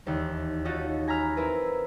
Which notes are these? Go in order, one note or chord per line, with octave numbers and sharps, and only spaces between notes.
E1 D#2
C#4 D#4 F4 F#4 A4
G#5 A#5 B5 F6
C4 E4 A#4 B4